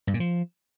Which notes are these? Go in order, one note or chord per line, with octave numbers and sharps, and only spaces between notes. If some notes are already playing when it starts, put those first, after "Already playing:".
G2
A#2
F3